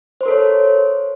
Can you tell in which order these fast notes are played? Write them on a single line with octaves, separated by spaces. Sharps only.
C5 C6 A#4 A4 C#5